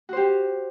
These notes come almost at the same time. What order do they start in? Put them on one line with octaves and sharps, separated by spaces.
F#4 C5 G4